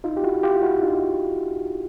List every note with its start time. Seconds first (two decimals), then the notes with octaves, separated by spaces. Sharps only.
0.04 D#4 F4
0.17 G4
0.24 E4 F#4
0.43 F4 G4
0.63 E4 F#4
0.83 D#4 F4